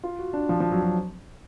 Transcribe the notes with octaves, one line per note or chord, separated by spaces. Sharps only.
F4
F#4
D4
F3
F3
F#3
F#3